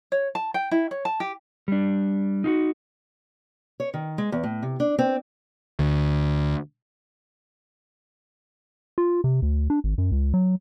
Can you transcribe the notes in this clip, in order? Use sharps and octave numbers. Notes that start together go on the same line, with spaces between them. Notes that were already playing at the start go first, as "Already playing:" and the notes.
C#5
A5
G5
E4
C#5
A5
G4
G3 D4
D#4 F4 F#4
C#5
D#3
G#3
E2
A2
C3
D4
C4
D2
F4
C3
D2
D4
G#1
F#2
C#2
F#3